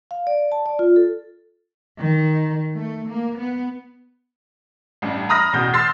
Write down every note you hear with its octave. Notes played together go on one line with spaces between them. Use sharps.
F5
D5
A5
D5
F4
A4
D#3
A3
A#3
B3
A1 G2
A#5 B5 D#6 F6 A#6
A1 E2 B2 G6
C6 E6 F6 A6 C7